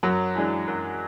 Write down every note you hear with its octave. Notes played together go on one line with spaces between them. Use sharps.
F#2 F#3
E3 G#3 D4
F#2